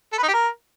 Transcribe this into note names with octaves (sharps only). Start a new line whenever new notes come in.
A4
B4
D#4
G4
A#4